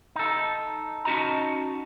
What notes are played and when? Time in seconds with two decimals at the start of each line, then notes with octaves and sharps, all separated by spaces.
0.16 D#4 A4
1.05 C#4 D#4 F#4 D#5 A5 A#5